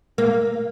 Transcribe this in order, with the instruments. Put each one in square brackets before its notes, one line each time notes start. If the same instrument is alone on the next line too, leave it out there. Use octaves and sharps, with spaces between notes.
[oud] A#3